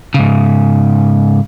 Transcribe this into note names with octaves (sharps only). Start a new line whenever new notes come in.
G#2 C#3